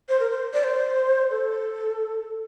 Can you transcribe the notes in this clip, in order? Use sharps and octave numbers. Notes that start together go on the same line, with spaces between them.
C5
A#4
C5
D5
C5
A4